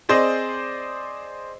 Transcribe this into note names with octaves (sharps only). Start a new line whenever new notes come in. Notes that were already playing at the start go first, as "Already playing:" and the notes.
C4 G#4 C5 D5 D#5